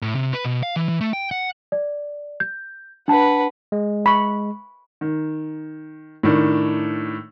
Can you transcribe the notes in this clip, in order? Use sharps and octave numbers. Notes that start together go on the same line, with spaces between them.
A2
C3
B4
B2
F5
E3
E3
A3
G5
F#5
D5
G6
D4 B4 F#5 A5
G#3
B5 C#6
D#3
A2 D#3 D4